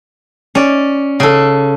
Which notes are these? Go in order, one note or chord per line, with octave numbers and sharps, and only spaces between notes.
C#4 D5
C#3 A4